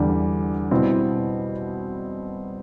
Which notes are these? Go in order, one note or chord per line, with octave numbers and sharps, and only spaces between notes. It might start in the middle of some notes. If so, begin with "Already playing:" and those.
Already playing: E2 D3 G3
B2 G3 C4 E4